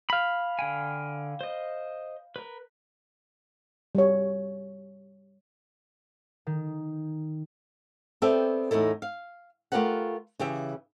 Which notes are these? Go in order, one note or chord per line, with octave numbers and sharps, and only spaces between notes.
F5 B5
D3 G5 G#5
C5 D#5
A#4 B4
G3 C#5
D#3
B3 C4 G4 A4 D5 E5
E2 A2 D#4 E4 A4
F5
A3 F4 G4 A#4 B4 F#5
C#3 E3 G4 E5